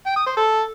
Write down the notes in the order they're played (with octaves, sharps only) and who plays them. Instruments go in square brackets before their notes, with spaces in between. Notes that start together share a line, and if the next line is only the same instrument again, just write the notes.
[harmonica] G5
D#6
C5
A4